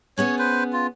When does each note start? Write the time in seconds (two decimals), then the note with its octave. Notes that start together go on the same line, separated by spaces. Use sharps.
0.18 B3 C#4 G#4 C#5
0.39 B4 C5
0.73 F4